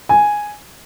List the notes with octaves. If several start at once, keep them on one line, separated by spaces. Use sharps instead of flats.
G#5